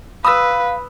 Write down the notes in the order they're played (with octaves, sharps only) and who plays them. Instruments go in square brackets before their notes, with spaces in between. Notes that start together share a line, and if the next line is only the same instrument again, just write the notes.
[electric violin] B4 [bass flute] F5 [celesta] B5 [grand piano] D#6 E6